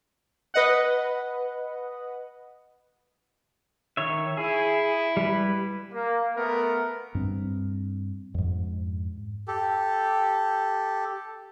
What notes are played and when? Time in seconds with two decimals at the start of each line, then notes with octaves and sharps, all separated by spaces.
0.54 B4 D#5 F#5
3.97 D#3 C#5 E5
4.37 E4 G#4
5.17 G3 B4
5.92 A#3
6.36 A3 B3 A#4
7.15 G2 C4
8.34 F2 G#2
9.48 G4 A4